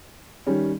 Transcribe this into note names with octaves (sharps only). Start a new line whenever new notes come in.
D#3 G3 C#4